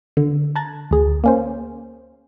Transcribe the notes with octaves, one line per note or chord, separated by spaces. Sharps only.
D3
A5 A#5 F#6 G#6 A6
D2 G#4
A#3 C#4 C5